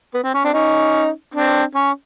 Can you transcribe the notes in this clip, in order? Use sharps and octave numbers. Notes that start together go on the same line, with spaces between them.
B3
C4
C#4
C4 D4
C#4 D#4
C4 D4
C#4